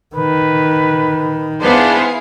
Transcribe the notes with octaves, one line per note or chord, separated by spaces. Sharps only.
D#3 B4
B3 D4 E4 G#4 B4 C5 F5